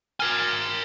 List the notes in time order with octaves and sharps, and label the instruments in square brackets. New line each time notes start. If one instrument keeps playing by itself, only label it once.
[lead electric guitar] A#4 G#5 [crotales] F6